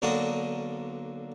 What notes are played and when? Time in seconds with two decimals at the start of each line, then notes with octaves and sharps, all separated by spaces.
0.02 B1 D3 A#3 D4 F#4 D#6